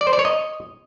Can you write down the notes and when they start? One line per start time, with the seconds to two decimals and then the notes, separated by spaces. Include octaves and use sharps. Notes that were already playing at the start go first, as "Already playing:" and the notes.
0.01 D5
0.07 C5
0.13 D5
0.19 C#5
0.25 D#5